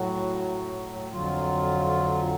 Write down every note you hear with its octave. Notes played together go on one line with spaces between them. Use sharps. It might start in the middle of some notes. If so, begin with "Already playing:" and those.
Already playing: A2 F#3 F#4
F2 D3 F#3 F4